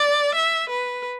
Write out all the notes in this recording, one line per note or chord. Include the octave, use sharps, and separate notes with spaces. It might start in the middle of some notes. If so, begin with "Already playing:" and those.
Already playing: D5
E5
B4